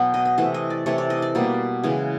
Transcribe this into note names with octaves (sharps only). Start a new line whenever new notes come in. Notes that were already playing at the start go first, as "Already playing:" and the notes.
Already playing: B2 F#3 B3 G5
D#5
D#5
C3 E3 A3 D#5
D#5
D5
C3 E3 A3 C#5
D5
D#5
D5
B2 G3 A#3
C#3 E3 G#3